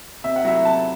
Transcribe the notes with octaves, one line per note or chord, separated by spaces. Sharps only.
C3 E5
F#5
F#3 A3 E4 E5
C3 A5